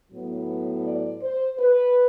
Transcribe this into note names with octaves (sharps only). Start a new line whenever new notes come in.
A2 F#3 B3
D5
C5
B4